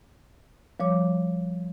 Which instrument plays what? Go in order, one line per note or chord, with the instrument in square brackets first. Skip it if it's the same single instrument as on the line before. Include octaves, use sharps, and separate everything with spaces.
[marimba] F3 G3 C#5 D6